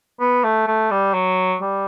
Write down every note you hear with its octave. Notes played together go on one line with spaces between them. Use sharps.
B3
A3
A3
G3
F#3
G3